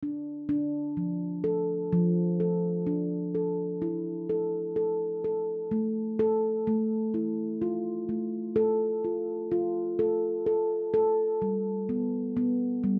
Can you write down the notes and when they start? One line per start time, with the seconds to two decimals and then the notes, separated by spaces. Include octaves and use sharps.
0.03 D4
0.49 D4
0.97 F3
1.44 A4
1.93 F3
2.40 A4
2.87 D4
3.35 A4
3.82 E4
4.29 A4
4.76 A4
5.24 A4
5.71 A3
6.19 A4
6.67 A3
7.14 E4
7.62 F4
8.09 A3
8.56 A4
9.04 F4
9.52 F4
9.99 A4
10.46 A4
10.94 A4
11.42 G3
11.89 B3
12.37 B3
12.84 G3